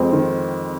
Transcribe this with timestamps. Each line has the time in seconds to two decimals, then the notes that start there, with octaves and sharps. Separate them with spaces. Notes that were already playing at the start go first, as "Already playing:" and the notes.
Already playing: F2 G#3 C4
0.13 D#3